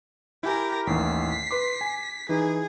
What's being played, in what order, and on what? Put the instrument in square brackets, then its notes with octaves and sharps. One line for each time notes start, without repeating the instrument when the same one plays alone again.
[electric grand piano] E4 G#5 [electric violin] G4 A#4
[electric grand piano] A1 D#2 A2 [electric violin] B6 C7
[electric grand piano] B4 C6 D6
G#5
[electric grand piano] E3 D#4 [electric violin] G#4